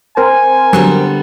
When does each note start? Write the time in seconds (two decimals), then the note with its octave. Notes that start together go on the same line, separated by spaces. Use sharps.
0.17 C4 A#4 C5 G#5
0.73 D3 F#3 G3 B3